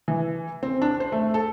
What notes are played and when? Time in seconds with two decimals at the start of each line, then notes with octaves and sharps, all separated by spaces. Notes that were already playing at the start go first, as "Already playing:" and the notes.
0.08 E3
0.63 C4
0.82 D4
1.00 C5
1.12 A3
1.34 A4